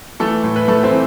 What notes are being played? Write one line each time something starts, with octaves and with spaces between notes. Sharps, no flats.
E3 A3 A4
A2
B4
A2 A3 A4
C4 C5
E3